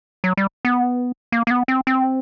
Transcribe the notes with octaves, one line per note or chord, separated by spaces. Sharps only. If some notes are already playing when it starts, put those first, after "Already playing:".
F#3
G3
B3
A#3
A#3
B3
C4
C4